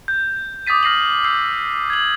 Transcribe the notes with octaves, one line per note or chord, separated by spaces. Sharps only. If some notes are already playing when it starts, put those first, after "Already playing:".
G6
D6 D#6 G6 A6 B6 D#7
D#6 F6 A#6 C7 D#7 F#7
E6 G6 C7
G#6 F#7